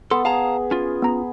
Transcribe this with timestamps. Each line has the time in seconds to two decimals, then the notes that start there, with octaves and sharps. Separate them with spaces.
0.11 B3 A4 C6
0.25 G#4 F5 A5 A#5
0.71 C#4 F4
1.02 B3 A#5